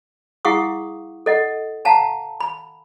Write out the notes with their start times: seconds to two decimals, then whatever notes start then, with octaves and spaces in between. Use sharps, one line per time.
0.45 E4 G#4 F5 F#5 C#6 D#6
1.26 A4 D#5 F#5
1.85 F5 F#5 A5 A#5
2.40 B5